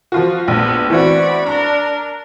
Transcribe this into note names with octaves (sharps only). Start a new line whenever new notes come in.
F3 F4 F#4
A#1 A3 B3
E3 C4 F#4 D5 B5 C#6
D4 A#4 A#5